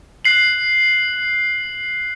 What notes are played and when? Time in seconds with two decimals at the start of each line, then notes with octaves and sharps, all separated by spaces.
0.25 F#6 C7 F#7